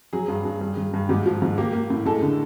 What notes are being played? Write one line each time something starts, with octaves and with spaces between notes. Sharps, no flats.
F#3 G#4
G2
G2
G2
G2
G2
G#2 G4
F3
G#2
A#3 G4
A#3
A2
G#3 A4
D3